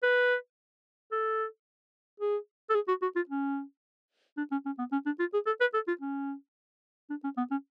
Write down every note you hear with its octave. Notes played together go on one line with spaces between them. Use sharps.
B4
A4
G#4
A4
G#4
F#4
F#4
F4
C#4
D4
C#4
C#4
B3
C#4
D4
F4
G#4
A4
B4
A4
F4
C#4
D4
C#4
B3
C#4